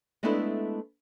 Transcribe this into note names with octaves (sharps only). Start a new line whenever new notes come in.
G#3 A3 B3 D4 E4 A4